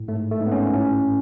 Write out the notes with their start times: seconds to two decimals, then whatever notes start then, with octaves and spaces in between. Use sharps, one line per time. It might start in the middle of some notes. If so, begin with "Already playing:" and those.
Already playing: A2
0.08 G#2 A3
0.31 A3
0.41 G#2
0.46 B3
0.52 C#4
0.74 A2 C#4